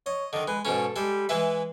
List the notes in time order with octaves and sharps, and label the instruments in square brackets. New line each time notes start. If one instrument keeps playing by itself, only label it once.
[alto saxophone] C#5 [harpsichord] D#5
[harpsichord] D3 D#3 [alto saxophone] D#5
[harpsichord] G#3 [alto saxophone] B4
[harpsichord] G#2 B2 C#4 [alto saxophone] A4
[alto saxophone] G3 [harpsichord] G#3 A4
[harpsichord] E3 G#3 B4 [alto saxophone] E5